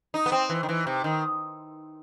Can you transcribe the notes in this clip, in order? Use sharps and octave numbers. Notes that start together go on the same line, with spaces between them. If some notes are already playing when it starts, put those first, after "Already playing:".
D#4
B3
C4
E3
D#3
E3
C3
D#3